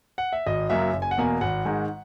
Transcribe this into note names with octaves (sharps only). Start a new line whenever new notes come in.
F#5
E5
G#1 D#5
F#2 C#3 F#3 A#3 E5
F#1
G#5
F#5
E2 B2 A#3 G#5
G#1 F#5
G#2 D#3 G#3